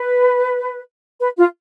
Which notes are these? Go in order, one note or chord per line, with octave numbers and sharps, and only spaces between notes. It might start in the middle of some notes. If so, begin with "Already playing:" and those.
Already playing: B4
B4
F4